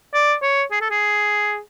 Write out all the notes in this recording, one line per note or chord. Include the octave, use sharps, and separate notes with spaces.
D5
C#5
G#4
A4
G#4